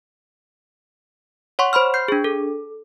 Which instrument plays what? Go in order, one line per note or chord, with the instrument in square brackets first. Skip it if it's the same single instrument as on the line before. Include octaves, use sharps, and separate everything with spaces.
[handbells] C#5 F#5 C6 C#6
C5 B5 C6 F6
G6 C7
D4 G#4
A4